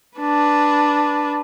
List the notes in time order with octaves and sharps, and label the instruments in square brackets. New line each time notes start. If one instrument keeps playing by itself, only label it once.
[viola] D4 B4